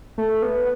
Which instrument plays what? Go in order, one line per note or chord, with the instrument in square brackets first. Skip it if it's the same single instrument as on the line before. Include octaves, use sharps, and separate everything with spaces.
[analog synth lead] A3
B3